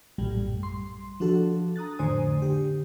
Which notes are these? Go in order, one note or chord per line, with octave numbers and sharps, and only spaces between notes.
A#1 F#2 A2 G3
C6
F3 D4 F#4 A4
A#5 D#6 F#6 A6
F2 A2 D3 C5 G#5 D#6
D3 G4